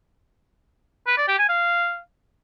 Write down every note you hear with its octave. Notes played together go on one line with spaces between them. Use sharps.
B4
D5
G4
G#5
F5